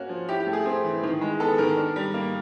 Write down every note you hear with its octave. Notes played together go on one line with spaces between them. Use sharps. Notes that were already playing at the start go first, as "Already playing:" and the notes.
Already playing: A#3 C#4 F#4
F3
E4 G4
G4
A3
G#4
C4 G#4
E3
D#3
G#3
B3 A4
D#3 A#4
D4
G3
A#3